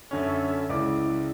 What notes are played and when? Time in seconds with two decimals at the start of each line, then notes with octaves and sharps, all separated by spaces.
0.11 F#2 D3 C#4 A4 E5
0.69 C#2 G#3 E4 D5 D6